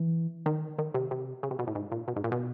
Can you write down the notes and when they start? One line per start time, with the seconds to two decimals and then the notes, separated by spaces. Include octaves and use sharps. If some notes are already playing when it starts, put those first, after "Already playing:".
Already playing: E3
0.46 D#3
0.78 D#3
0.94 C3
1.11 C3
1.43 C#3
1.51 C3
1.59 B2
1.67 A2
1.75 G#2
1.92 A#2
2.08 B2
2.16 G#2
2.24 A#2
2.32 B2